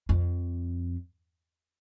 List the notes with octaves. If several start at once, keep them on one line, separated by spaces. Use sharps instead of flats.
F2